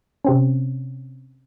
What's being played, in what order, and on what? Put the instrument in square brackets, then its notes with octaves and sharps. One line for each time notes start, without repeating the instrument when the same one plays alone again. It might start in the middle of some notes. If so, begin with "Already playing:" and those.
[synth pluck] C3 C4 C#4